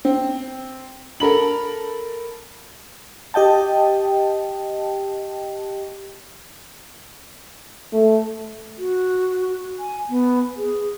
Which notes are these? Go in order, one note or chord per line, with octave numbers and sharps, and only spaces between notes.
C4
A4 A#4 B5 F#7
G4 D#5 G5 A5
A3
F#4
G#5
B3
G#4